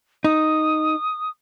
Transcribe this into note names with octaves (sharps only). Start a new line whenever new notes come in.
D#4 D#6